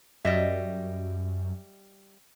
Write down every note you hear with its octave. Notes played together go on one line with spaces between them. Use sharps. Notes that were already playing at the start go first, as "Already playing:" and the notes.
F#2 G3 D#5 E5